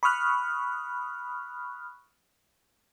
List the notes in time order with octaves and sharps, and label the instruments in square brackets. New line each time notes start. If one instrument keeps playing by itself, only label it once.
[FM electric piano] B5 C#6 D#6 F6 F#6